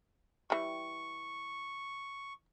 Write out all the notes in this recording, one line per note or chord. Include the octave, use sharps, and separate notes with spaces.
E3 G3 C#6